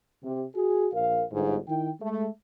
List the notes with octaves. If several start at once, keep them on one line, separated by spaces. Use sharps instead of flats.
C3
F#4 G#4
A#1 A#4 F5
G1 G#2
D#3 E4 G5
G#3 A3